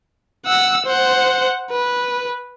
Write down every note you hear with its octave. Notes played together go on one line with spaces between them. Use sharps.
F#5 E6
C5 F#5
B4